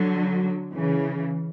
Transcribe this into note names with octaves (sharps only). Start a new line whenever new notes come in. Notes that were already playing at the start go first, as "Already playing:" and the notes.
Already playing: D3 F#3
C#3 E3